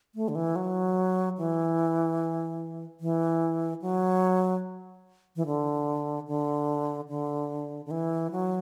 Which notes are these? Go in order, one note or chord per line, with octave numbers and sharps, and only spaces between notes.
A3
D3
E3
F#3
E3
E3
F#3
E3
D3
D3
D3
D3
E3
F#3